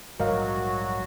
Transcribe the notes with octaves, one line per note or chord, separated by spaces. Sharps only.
A#1 G#2 F#3 G3 F#4 A#4 D#5 F5